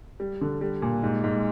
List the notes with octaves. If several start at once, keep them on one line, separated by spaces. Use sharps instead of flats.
G3
D3
G3
A#2
G#2
G#2